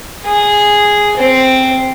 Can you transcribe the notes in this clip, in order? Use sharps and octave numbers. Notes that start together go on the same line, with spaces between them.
G#4
C4